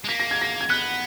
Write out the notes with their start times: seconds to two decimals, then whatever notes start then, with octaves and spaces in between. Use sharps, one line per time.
0.04 G#3
0.08 A#3 B6
0.20 A#6
0.31 G#6
0.41 A#6
0.61 G#6
0.70 B3 F#6